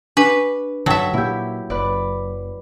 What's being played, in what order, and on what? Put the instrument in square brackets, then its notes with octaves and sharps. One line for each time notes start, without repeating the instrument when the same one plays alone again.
[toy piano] D4 G4 D6 [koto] B4
[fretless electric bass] G2 D3 [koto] F#3 E5 [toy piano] D#4 G5
[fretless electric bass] A#2 A#3 [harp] E4 G4
[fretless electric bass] F#1 [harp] B4 D5